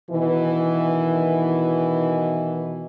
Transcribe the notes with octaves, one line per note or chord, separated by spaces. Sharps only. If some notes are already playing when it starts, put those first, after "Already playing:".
B2 D#3 E3